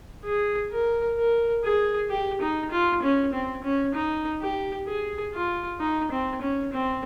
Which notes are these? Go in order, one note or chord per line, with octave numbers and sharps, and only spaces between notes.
G#4
A#4
A#4
G#4
G4
D#4
F4
C#4
C4
C#4
D#4
G4
G#4
F4
D#4
C4
C#4
C4